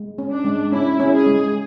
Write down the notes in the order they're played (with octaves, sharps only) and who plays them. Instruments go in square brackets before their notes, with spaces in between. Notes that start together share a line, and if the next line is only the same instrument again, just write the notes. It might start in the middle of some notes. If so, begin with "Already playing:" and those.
Already playing: [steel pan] G#3
C#4
[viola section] D4
[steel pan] G#3
[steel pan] C#4 [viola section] E4
[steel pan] C#4
[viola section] G#4
[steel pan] G#3